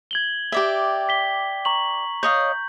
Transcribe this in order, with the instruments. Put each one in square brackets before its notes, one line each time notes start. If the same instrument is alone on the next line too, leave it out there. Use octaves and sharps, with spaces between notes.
[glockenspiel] G#6 F#7 G7
[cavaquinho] G4 D5 E5
[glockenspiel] B6 G7
A#5 C#6 F#7
[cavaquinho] C#5 D#5 F5 [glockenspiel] G6